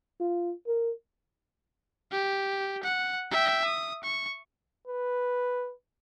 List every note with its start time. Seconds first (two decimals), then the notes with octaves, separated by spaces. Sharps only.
0.20 F4
0.67 A#4
2.11 G4
2.83 F#5
3.31 E5 G5
3.65 D#6
4.03 C#6
4.87 B4